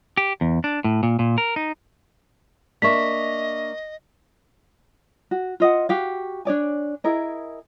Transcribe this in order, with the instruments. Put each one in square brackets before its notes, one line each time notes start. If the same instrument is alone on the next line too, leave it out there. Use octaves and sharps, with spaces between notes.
[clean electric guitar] G4
E2
D4
A2
A#2
A#2
A#4
D#4
[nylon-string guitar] A#3 D4 E5 [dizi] D#5 [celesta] C#6 B6
[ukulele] F#4
F4 D#5 F#5
F#4 G4 F5
D4 C#5 D5 G#5
E4 G#4 A#4 D#5